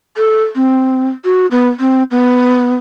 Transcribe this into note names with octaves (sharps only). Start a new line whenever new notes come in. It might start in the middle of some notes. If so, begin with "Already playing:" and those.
A4
C4
F#4
B3
C4
B3